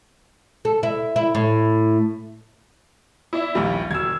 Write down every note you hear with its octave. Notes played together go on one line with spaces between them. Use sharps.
A4
E4
E4
A2
E4 D5 E5
A#1 D#2 G3
E1 E6 G#6